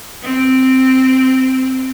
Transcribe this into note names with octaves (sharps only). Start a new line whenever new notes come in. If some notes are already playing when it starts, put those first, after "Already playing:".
C4